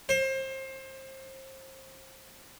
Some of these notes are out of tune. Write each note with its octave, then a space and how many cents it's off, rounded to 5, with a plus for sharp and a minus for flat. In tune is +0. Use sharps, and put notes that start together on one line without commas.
C5 +30